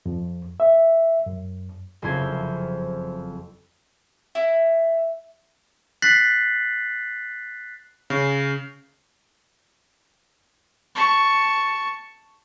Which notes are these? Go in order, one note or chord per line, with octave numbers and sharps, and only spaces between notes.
F2
E5
F#2
F#1 F2 E4 C5 G#6
E4
F#6 A6 B6 C7 F#7
C#3
A5 C#6